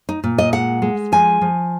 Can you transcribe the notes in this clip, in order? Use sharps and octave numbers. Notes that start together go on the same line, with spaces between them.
D#4
A#2
D#5
G#3 F#5
G#3
F3 G#5
F3